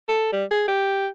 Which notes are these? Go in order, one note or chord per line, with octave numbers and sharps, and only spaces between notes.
A4
G3
G#4
G4